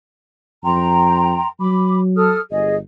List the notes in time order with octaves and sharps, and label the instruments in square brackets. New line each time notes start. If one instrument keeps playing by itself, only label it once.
[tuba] F2 [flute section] G5 A#5 C6
[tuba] F#3 [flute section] B5 D6
[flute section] A4 D#6 F6
[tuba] G1 [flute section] G#4 D#5